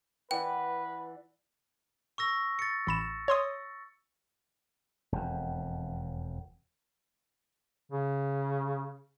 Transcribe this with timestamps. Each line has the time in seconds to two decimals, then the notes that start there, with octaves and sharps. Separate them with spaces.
0.31 E3 B4 D5 F#5 G5
2.18 C#6 E6 A#6
2.59 A6 C#7
2.87 A1 B5 E7
3.28 C#5 C6 D#6
5.12 E1 F2
7.92 C#3